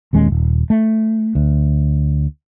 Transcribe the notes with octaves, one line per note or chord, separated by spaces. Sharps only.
D#1 D#2 G#3 C#4
D#1
A3
D2